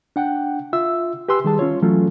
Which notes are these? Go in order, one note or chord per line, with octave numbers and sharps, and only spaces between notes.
D4 F#5 G5
F4 E5 E6
G4 B4 G#5 C6 E6
D#3 G3 G#4 A5
C#4 F4 C#5
E3 F#3 A3 C#4 F4 A4